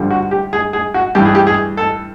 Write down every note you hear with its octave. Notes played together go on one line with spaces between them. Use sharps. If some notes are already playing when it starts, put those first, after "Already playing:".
Already playing: G2 D3 F3
F#4
G4
G#4
G#4
F#4
G2 E3 G4
G#4
G4
G#4
A4